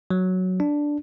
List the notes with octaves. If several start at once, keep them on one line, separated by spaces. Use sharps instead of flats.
F#3
D4